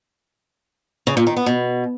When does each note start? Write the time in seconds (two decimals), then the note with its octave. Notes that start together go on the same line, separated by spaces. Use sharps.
1.07 C#3
1.17 A#2
1.27 D#3
1.36 B3
1.46 B2